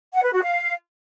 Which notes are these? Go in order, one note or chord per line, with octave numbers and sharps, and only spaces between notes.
F#5
B4
F#4
F5